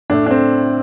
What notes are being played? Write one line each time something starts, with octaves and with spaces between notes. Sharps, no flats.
A2 A3 D4
D4
C4